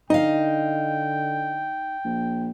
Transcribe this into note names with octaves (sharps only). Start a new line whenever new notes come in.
D3 D#4 D#5 F5 G5
A#1